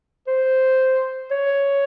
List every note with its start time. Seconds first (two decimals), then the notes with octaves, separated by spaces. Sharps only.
0.27 C5
1.31 C#5